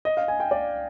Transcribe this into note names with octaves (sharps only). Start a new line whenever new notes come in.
D#5
F5
G#5
G5
D5